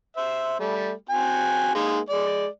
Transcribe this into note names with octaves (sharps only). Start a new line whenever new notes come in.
C5 E5
G3 A3
C4 F#4 G#5
G#3 A#3 D#4
G#3 D5